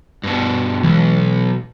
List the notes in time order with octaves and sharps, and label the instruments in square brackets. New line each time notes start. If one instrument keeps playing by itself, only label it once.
[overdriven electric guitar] G2 B2
[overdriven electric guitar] B1 [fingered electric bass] E3 G#3